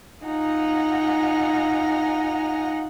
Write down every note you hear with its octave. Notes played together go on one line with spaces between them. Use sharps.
D#4 F4 F#5 G#5 A#5